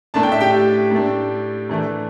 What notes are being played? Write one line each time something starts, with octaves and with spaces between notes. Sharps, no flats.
A2 A3 D4 A5
G5
E5
G4 G5
A2 A3 D4
A2 E3 A3 D4